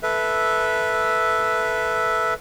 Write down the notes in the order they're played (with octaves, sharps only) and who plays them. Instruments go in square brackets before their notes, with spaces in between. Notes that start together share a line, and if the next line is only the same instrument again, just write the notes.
[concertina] A4 B4 E5